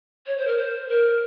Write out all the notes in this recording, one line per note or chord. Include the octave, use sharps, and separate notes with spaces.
C#5
C5
A#4
C5
A#4